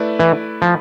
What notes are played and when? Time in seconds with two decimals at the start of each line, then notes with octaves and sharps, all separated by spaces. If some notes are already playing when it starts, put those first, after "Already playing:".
Already playing: A3 E4 B4 D5
0.19 E3
0.62 F3